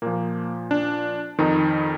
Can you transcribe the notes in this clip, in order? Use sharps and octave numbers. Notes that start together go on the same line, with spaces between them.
A#2 F3 A#3
D4
F2 D#3 D#4